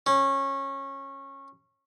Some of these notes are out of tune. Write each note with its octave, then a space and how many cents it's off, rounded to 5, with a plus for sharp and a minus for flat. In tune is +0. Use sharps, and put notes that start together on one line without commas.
C#4 -20